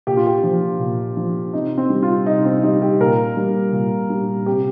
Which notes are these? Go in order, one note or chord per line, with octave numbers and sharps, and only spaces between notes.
A#2 G4
F4
G4
F3
A#2
F3
C3 D#4
C4
G3
F4
C3 D#4
C4
G3 D#4
G4
A#2 A#4
G3
A#2
G3
C3 G4